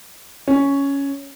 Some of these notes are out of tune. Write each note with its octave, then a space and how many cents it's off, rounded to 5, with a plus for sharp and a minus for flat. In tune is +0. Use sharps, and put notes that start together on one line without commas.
C#4 +5